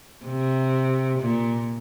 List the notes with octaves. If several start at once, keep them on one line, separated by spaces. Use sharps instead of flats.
C3
A#2